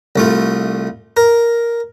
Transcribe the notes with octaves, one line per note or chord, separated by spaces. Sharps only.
C2 A3 F4
A#4